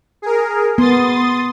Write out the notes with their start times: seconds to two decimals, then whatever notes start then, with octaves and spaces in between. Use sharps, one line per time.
0.22 G#4 A#4
0.78 B3 C6 D#6 A6